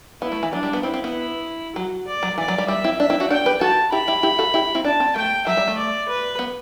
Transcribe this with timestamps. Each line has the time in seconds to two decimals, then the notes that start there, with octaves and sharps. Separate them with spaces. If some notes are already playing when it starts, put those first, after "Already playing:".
0.21 B3 E4
0.32 A3
0.43 E3
0.53 F#3 D4
0.63 G3
0.73 B3
0.83 C4 E4
0.94 C4
1.04 B3
1.76 F#3 F#4
2.07 D5
2.23 F#3
2.38 E3 D5
2.48 F#3
2.58 G3
2.68 G3 E5
2.84 C4 E4
2.99 D4 E5
3.10 C4 E4
3.20 D4 F#4
3.30 D4 F#4 G5
3.46 G4 B4
3.61 F#4 A4 A5
3.92 E4 G4 B5
4.07 E4 G4
4.23 E4 G4
4.39 F#4 A4
4.54 E4 G4
4.75 C4 E4
4.85 D4 A5
5.00 C4
5.16 A3 G5
5.47 F#3 E5
5.57 G3
5.68 A3
5.77 D5
6.09 B4
6.39 B3